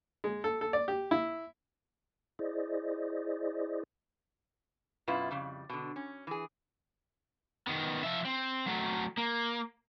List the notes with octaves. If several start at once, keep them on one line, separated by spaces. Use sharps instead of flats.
G#3
A4
A4
D5
G4
E4
E4 G#4 C5 D5 D#5
F#2 B2 E4 F4 B4
F2 C#3 G3
B2 D3
C#4
E3 G#4
D#3 B3
F3 E5
C4
F#3 A3
A#3